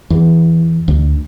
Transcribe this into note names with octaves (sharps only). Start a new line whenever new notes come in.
E2
D2